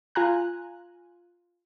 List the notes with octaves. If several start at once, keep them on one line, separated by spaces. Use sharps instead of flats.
F4 G#5 A#5 F#6